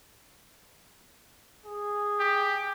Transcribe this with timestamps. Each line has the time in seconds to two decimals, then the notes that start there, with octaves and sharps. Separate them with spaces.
1.65 G#4
2.20 G4